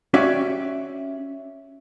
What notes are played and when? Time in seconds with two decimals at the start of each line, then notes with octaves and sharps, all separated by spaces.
0.14 C#4 F#4 G4 D5 E5